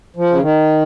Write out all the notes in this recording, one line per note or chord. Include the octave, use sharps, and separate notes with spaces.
F3
C#3
D#3